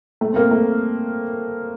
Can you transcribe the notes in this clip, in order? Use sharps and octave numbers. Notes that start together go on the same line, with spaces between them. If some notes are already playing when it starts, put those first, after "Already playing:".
A3
C4
A#3
A3